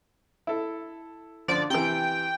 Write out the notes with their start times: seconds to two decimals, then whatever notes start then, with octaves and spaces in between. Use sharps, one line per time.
0.47 E4 A4
1.48 D3 F3 C5 D5
1.70 C3 E3 G5